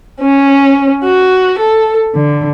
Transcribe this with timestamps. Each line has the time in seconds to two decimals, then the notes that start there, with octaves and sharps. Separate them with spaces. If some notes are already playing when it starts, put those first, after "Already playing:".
0.22 C#4
1.05 F#4
1.59 A4
2.15 D3